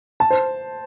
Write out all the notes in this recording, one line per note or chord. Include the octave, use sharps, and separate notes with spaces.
A5
C5